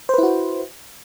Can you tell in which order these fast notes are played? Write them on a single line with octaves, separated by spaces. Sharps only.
C5 B4 E4 F#4